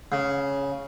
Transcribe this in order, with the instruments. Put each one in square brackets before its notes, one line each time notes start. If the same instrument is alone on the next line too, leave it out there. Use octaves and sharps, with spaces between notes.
[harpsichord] C#3